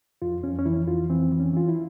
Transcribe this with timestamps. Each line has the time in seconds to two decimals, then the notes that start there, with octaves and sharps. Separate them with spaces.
0.22 F2 F4
0.44 F2 C#4
0.59 C#4
0.66 E3 E4
0.87 F2 F4
1.09 E3 C4
1.32 E3
1.39 C#4
1.53 E3 F4
1.69 E4